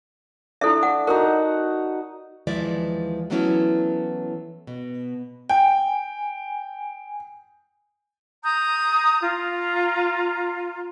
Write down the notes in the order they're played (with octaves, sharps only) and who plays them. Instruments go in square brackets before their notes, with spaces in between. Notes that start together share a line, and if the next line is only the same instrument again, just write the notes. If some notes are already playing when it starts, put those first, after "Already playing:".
[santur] D4 [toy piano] E4 A4 E5
[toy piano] F#5
[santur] D#4 F#4 F#5 [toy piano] A#4
[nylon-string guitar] D#2 E3 F3 G#3 D5 E5
E3 F#3 A3 B3 C#4 E4
B2
[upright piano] G5 [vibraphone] G#5
[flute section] A#5 D#6 G6
F4 A#5